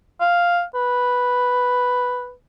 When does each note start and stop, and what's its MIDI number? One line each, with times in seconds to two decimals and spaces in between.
0.21 0.63 77
0.75 2.33 71